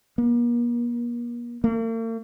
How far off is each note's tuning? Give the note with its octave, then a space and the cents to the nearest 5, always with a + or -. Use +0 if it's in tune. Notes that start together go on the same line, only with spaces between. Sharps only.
A#3 +40
A#3 -45